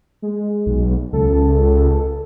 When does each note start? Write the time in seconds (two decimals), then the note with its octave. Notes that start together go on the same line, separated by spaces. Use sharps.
0.22 G#3
0.66 B1
1.13 C#2 A4